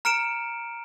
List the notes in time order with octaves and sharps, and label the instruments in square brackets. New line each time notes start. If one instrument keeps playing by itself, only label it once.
[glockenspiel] A#5 F6 C#7 D7 E7